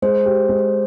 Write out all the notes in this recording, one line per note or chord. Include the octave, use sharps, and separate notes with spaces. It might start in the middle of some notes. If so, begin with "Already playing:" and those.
G#3 C5
G4
G#3